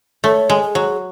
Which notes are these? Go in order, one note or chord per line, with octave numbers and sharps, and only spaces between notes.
A3 C#5
G#3
G#4
F#3